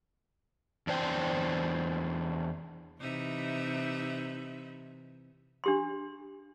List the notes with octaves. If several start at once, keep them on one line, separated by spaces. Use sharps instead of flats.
E2 D4 C5 G5
C3 E3 D#4 E5
D4 G4 C6